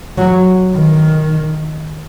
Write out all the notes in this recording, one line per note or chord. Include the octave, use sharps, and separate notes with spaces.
F#3
D#3